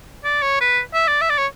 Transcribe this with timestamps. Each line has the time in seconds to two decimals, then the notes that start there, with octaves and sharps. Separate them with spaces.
0.24 D5
0.42 C#5
0.61 B4
0.94 E5
1.08 D5
1.21 E5
1.30 D5
1.38 C#5